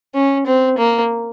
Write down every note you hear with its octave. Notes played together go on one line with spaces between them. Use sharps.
C#4
C4
A#3